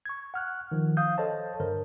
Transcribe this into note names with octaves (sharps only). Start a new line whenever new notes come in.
C#6 G#6
F#5 F6 F#6
D#3 F3
F5 D#6 G6
A4 C5 C#5 D#5 A5
G2 D3 A#4 C5